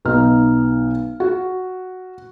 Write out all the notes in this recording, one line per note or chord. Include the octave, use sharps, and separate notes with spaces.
B1 B3 D#4 F6
F#4